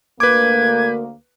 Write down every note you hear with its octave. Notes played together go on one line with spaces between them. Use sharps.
D2 A#3 B4 D6 G#6